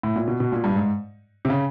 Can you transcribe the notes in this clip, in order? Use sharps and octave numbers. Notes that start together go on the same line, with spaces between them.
A2
A#2
B2
B2
A#2
G2
G#2
C3
C#3